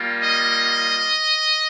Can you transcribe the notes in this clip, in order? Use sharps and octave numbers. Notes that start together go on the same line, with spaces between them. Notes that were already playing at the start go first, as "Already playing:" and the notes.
Already playing: G3 A#3 F4
D#5